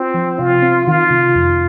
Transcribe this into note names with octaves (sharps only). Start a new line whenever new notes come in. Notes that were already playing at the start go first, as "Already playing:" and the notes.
Already playing: C4 F4
F3
C3 F4
C4
D#3 F4
C3
F2